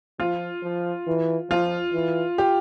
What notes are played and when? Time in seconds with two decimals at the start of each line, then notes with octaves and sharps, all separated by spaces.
0.19 F3 F4
0.63 F3
1.07 E3
1.50 F3 F4
1.94 E3
2.38 G4